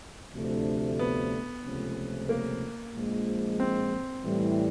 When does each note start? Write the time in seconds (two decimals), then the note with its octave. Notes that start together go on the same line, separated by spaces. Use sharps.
0.35 D2 C3 F3 A3 D4
0.99 B3
1.64 C#2 C3 F3 A3 C#4
2.29 A#3
2.94 A#1 A#2 F3 G#3
3.60 C4
4.24 A2 E3 G3